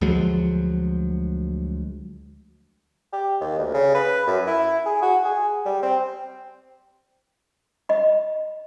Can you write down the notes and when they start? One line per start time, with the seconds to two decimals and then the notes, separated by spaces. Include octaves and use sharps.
0.01 D2 F3 F#3 G#3
3.13 G4
3.41 D#2
3.58 D2
3.74 C#3
3.94 B4
4.27 F#2
4.47 E4
4.86 G#4
5.02 F#4
5.25 G#4
5.65 G3
5.83 C4
7.89 D#5 B5